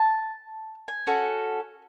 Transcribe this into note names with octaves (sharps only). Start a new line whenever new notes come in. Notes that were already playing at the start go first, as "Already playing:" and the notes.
Already playing: A5
G#5
C#4 F#4 A4